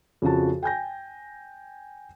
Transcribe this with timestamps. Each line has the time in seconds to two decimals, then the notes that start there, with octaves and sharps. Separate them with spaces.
0.22 F2 C#3 F3 F#4 A5
0.63 G5 G#5 G6 A#6